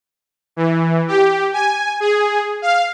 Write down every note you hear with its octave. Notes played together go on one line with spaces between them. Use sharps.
E3
G4
G#5
G#4
F5